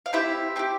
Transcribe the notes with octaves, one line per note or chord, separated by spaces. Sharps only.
F5
C4 E4 G4 E5
C4 E4 G4